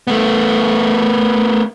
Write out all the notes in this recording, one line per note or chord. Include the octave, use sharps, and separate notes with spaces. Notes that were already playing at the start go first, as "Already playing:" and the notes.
A3 B3